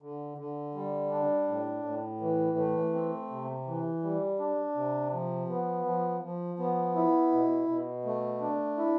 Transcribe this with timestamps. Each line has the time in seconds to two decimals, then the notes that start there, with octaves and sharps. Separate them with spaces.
0.02 D3
0.38 D3
0.75 G3
1.11 D4
1.48 A2
1.84 A2
2.21 E3
2.57 A3
2.93 C4
3.30 C3
3.67 E3
4.03 G3
4.40 D4
4.76 C3
5.12 F3
5.49 B3
5.85 F3
6.22 F3
6.59 B3
6.96 E4
7.32 B2
7.68 B2
8.05 A3
8.41 D4
8.78 E4